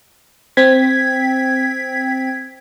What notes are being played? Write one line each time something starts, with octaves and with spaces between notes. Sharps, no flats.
C4 G5 G#6 B6